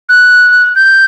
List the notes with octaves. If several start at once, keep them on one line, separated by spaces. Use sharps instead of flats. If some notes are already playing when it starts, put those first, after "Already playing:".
F#6
G6